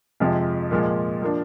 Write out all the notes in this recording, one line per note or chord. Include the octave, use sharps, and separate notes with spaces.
F2 C3 F3 G#3
A#2 F3 G#3
F3 A#3 D4